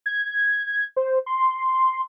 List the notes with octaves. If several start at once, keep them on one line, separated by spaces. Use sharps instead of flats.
G#6
C5
C6